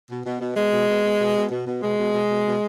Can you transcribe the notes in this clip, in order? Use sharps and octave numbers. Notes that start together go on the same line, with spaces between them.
B2
B2
B2
B2 G#3
B2
B2
B2
B2
B2
B2
B2
B2 G#3
B2
B2
B2
B2